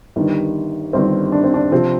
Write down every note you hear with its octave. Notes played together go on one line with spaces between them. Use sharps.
G1 G2 D#3
G1 G2 D#3 C4
D4
C4
D4
C3 F3 C4